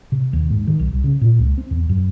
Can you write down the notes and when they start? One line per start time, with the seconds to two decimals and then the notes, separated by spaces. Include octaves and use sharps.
0.12 C3
0.33 D#2
0.50 G#2
0.67 D#3
0.80 B1
0.92 C2
1.04 C#3
1.21 A#2
1.39 C#2
1.58 C4
1.71 E2
1.89 F#2